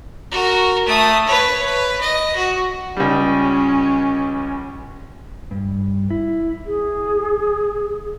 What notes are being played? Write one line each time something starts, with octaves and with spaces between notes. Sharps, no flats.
F#4 A#4
A3 D#6
B4 C#5
B4
D#5
F#4
C#2 G3 C#4
G2
E4
G#4